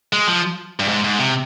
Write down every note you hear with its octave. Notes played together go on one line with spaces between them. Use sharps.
G#3
F3
G2
G#2
G#2
C3